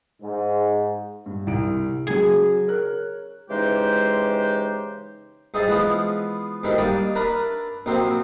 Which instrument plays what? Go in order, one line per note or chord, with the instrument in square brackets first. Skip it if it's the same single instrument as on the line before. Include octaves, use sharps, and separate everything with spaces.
[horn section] G#2
[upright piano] G2
C2 D7
[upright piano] C#3 F#3 [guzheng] G#4
[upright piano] A#4 C#5 F#6
[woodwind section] C#3 E3 G#3 D#4 G4 C5
[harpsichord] G2 D#4 G#4 C5 E5 A5
E3 F3 G#3 B3 E4 F4
G#2 B2 D#3 G3 D4 E4
G3 A#3 D4 D#4 D5
D4 A#4 B4 E5 A5 A#5
A#1 C3 F#3 A#3 C4 C5